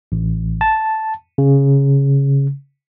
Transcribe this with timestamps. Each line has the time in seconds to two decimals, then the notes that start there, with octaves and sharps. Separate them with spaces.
0.12 A1
0.61 A5
1.38 C#3